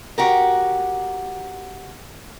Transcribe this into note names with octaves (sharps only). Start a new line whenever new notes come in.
F#4 G4 A#4